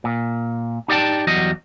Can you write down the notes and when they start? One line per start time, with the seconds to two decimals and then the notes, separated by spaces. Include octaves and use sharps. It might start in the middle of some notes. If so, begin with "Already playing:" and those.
0.04 A#2
0.88 D#4 G4 D5 E5 G5 A5
1.27 E2 F#3 G3 D#5